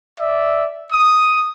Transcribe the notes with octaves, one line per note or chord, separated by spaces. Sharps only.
D5 E5
D#6